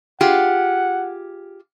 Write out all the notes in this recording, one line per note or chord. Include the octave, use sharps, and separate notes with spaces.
F4 G4 G#4 F#5